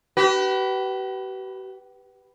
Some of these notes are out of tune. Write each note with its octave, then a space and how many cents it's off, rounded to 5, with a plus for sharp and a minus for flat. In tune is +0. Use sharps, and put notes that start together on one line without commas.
G4 -45 B4 +0